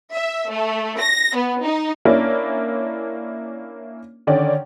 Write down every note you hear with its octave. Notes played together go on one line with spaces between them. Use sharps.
E5
A3
A#6
B3
D#4
A#3 C#4 D4 E4
D3 D#3 C#4 D5